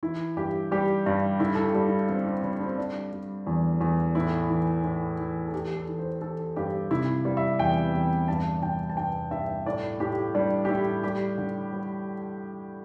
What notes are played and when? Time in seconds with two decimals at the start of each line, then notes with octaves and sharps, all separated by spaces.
0.03 E3 E4
0.37 G2 G4
0.72 G3 G4
1.06 G2 D4
1.40 D3 E4
1.55 A4
1.63 G4
1.75 G3
1.86 E4
2.09 D3 C4
2.26 C4
2.43 D3 D4
2.61 C4
2.78 G3 D4
3.12 G3
3.47 E2
3.81 E2
4.15 A2 E4
4.50 E3
4.84 A2
5.18 E3
5.48 A4
5.53 E3 G4
5.76 A4
5.88 E3
5.99 C5
6.21 E3 A4
6.56 G2 G4
6.90 C3 E4
7.25 G3
7.37 E5
7.59 E2 G5
7.94 E2
8.28 G2 A5
8.63 G2 G5
8.89 A5
8.97 G2 G5
9.31 G2 E5
9.66 A2 D5
10.00 A2 G4
10.35 G3 D4
10.65 G4
10.69 A2 E4
11.04 G3 G4
11.38 D3
11.73 G3